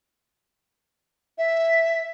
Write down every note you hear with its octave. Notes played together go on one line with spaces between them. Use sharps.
E5